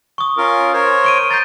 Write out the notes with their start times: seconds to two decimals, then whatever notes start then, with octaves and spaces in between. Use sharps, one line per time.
0.18 C#6 D#6
0.38 C#4 F4 A#4
0.73 A#4 C5 C#5
1.04 C#6 D7 D#7
1.31 A#5 C6 G6 A6